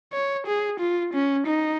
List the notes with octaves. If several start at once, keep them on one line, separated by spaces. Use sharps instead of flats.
C#5
G#4
F4
C#4
D#4